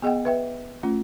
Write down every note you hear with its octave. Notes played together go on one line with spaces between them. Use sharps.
B3 G#4 D#5 F#5 G5
B4 E5 G5
A3 C#4 F4